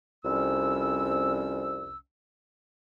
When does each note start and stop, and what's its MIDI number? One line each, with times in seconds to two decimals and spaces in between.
0.24 1.97 36
0.24 1.97 41
0.24 1.97 55
0.24 1.97 61
0.24 1.97 88